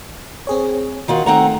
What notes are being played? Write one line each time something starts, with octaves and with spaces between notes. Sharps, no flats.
C4 G#4 C#5
D#3 F4 F#4
D#3 A3 C4 F#5 A#5